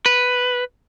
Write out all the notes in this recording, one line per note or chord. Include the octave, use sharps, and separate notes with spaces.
B4